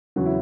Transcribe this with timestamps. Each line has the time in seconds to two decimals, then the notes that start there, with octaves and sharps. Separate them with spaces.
0.16 E2 C#3 F#3 F#4
0.26 E4